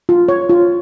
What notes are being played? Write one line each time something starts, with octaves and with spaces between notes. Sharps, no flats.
F4
C#5
F4